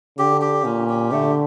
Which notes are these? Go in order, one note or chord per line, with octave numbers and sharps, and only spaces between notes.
D3 G4
G4
A#2 C#4
G4
D3 A3